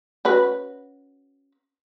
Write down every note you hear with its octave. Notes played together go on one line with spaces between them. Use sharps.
C#4 F#4 B4